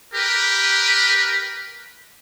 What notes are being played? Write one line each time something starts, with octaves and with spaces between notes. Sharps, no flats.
G4 A#4 B4